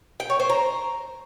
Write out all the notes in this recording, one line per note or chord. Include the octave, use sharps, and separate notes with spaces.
G5
C#5
C5
A#5